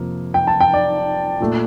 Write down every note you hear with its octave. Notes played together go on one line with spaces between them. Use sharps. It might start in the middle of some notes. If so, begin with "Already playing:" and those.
Already playing: F2 C3 A#3
G5
A5
G5
D5
A#2 A3